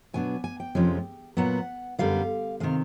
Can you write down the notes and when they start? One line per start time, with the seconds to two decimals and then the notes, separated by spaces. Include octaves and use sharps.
0.13 B2 F#3 B3 D4 G#5
0.44 G#5
0.60 G5
0.75 F2 C3 F3 G#3 C#4
1.37 A#2 F#3 B3 F#5
1.99 F#2 D3 G3 B3 F5
2.60 C3 D#3 G#3 F5